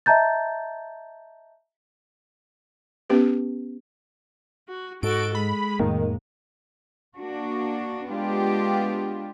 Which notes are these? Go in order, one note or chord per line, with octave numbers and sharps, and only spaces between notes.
D#5 E5 A5 A#5 G6 A6
B3 C#4 G4 B4
F#4
G#2 F#4 A4 D7
G#3 B5
F2 A2 D#3 A#3
A#3 D4 F#4
G#3 B3 D4 F4 G4